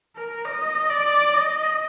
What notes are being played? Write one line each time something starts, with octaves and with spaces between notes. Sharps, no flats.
A#4
D#5
D5
D#5